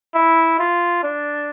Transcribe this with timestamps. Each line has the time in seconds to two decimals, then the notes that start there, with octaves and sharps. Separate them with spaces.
0.14 E4
0.59 F4
1.03 D4